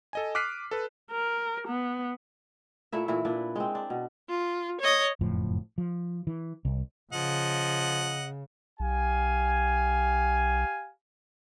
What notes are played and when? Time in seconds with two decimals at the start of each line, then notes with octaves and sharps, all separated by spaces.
0.13 A4 D#5 G#5
0.35 D6 F6 F#6 B6 C7 D#7
0.71 A4 B4
1.11 A#4
1.68 B3
2.92 A#2 A3 E4 E5
3.08 A#2 E3 E4
3.25 A#2 D4 B4
3.56 G#3 C4
3.75 D4
3.90 B2
4.29 F4
4.81 C#5 D#5
5.21 F#1 F2 A2 F3
5.78 F3
6.27 E3
6.65 C2
7.13 C#3 F3 D#5 F#5
8.80 B1 G4 F5 G#5